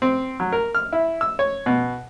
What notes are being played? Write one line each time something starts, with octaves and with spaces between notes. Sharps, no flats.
C4
F#3
A#4
F6
E4
E6
C#5
B2